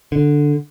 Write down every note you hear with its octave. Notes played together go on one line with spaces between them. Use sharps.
D3